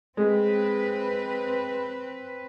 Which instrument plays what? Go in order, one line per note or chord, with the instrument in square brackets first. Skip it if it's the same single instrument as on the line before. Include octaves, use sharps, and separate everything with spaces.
[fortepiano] G#3 [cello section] C4 B4